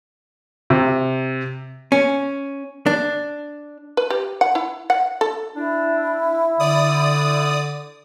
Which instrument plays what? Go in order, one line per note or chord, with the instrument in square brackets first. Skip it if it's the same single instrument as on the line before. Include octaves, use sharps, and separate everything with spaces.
[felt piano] C3
[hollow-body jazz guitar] C#4
D4
[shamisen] B4
G4
F#5
E4
F#5
A4
[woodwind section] D4 [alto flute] E4
[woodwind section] D3 [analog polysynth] D5 D#6